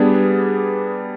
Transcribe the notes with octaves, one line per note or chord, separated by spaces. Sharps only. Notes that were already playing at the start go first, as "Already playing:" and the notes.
Already playing: G3 B3 D4 G#4 B4